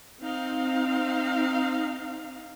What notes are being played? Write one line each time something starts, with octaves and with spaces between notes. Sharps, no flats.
C4 D#4 F5